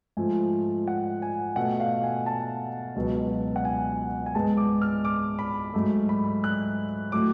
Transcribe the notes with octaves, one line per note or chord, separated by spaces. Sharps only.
G#2 F3 A3 G#5
F#5
G#5
B2 A3 F#5
F5
G#5
A5
C#2 B2 F#3 B3
F#5
G#5
G#5
G#2 G#3 B3 A5
D6
F6
D6
B5
G#2 F#3 A3
B5
F#6
A2 F#3 A3 D6